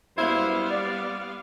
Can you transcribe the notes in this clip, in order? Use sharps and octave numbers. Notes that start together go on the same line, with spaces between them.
F#2 G3 B3 E4 C5 F5
D5